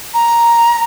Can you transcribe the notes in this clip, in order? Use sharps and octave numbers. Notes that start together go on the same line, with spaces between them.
A#5